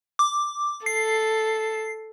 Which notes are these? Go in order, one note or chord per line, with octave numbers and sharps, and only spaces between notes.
D6
A4 C7